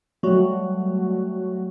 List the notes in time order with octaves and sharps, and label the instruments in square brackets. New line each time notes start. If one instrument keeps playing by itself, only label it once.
[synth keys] F#3 G3 A3 F#4